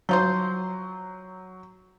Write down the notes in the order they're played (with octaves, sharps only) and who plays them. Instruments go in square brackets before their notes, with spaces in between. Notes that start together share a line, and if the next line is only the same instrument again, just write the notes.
[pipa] F3 D#4 C5 [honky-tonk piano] F#3